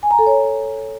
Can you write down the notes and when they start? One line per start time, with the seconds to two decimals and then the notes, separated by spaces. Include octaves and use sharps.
0.03 G#5
0.11 A#5
0.19 A4
0.26 C#5